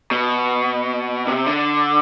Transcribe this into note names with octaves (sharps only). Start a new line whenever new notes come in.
B2
C3
D3